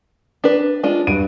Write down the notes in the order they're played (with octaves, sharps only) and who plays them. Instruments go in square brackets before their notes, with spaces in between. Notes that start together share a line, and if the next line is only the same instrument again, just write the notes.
[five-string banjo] D4 B4
G#3 D4 F4
[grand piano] G2 D7 D#7 [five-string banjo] F#4